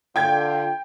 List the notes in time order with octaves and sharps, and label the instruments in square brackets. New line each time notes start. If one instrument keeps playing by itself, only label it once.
[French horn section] D3 F4 [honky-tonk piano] G5 G#6